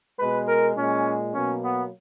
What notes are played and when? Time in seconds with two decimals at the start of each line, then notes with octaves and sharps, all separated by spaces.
0.19 B2 G#3 B4
0.48 A#4
0.76 A#2 G#3 C#4
1.34 B2 F#3 A#3 C#4
1.63 B3